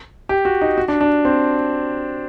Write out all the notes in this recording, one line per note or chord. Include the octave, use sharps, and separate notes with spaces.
G4
F#4
D#4
F#4
D4
D4
C4